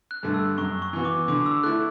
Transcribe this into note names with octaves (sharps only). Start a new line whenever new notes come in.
F#6
G2 D3 A3
E6
F#2 C#6
C#6
E3 B3 F#4
D6
D3 D6
E6
A3 E4 F#6